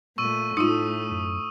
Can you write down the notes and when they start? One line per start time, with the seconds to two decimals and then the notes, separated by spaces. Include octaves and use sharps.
0.18 A#2 A3 C#6 E6 D#7
0.57 A2 A3 D#4 F4 D#6 E6
1.11 F#2